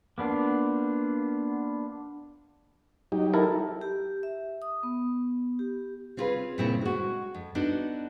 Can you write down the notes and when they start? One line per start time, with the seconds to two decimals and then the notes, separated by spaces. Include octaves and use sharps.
0.18 A#3 B3 D4 F4
3.12 F#3 D#4 G4
3.34 E4 A4 A#4
3.81 G4
4.23 E5
4.62 D#6
4.83 B3
5.59 G4
6.17 C4 C#4 F4 G#4 B4
6.58 A#2 C#3 C4 C#4 E4 F4
6.81 G#3 F#4
7.34 F2
7.55 B3 D4 D#4 F#4 A4